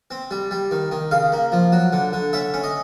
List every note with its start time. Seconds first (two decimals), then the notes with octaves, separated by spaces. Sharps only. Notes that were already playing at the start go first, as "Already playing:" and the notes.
0.11 C4
0.31 G3
0.51 G3
0.71 D#3
0.92 D#3
1.11 C#3 F5
1.32 A#3
1.52 F3
1.72 F#3
1.93 D3
2.13 D3
2.33 C#4 E5
2.54 C#4
2.63 D#5